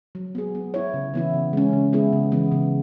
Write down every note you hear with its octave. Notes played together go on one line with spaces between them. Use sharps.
F#3
B3 G#4
B3
E4 C#5
C#3
E3 B3 E4
C#3
G#3 C#4
C#3
G#3 B3 E4 G#4
C#3
E3 B3
C#3